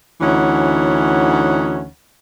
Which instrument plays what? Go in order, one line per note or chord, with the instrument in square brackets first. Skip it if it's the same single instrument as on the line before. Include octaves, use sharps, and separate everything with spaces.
[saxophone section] D2 E3 C#4 D#4 C#5 F#5